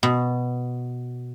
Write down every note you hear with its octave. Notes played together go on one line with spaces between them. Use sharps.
B2